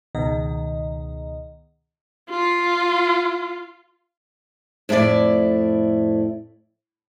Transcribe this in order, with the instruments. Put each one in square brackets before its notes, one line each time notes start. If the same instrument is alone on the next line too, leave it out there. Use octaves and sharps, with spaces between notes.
[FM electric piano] C#2 B2 D#3 D#5
[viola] F4
[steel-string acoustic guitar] F2 A2 E4 A4 D5